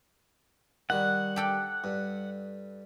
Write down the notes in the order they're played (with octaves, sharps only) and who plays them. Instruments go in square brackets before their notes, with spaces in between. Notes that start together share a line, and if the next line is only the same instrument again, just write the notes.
[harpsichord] D#3 G3 [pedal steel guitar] F#5
[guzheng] G4 A4 G5
[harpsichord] G2